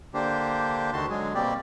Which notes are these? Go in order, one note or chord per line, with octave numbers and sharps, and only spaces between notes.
D3 A#3 D4 G4 C5
D2 D3 D#3 F#4 A5 C6
D3 F#3 G#3 G#4
B2 G3 A#3 C4 G4 D5